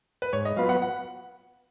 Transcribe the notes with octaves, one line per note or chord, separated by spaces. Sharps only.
B4
G#2 C#5
D#5
F#3 B3 F4 B4 F5
F#5
F#5